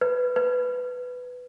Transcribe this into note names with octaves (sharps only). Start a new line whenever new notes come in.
B4
B4